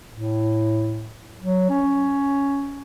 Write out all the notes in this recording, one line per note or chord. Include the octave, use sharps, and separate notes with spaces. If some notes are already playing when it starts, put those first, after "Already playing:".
A2
F#3
C#4